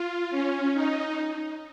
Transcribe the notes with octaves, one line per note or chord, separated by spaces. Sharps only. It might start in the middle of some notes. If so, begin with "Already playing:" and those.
Already playing: F4
C#4
D#4